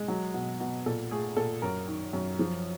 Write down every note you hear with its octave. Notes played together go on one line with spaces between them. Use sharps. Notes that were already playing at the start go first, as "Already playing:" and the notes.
Already playing: G#3
F#3
B2
B2
A#2 A4
A3 G#4
A#2 A4
F#2 A#4
D#3
F#2
F3